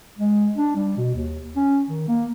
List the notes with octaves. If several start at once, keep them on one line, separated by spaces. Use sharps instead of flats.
G#3
D4
G3
B2
D#2
C#4
D#3
A#3